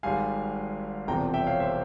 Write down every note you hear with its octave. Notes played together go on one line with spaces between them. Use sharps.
G#1 G#2 G3 F5 G#5
E1 E2 C3 F3 G5 A#5
E5 G5
C#5 F5
C5 E5